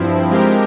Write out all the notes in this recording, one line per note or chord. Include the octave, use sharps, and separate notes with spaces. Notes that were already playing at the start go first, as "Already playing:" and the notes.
Already playing: G2 F3 C4 E4
F3 G#3 C4 G4 A#4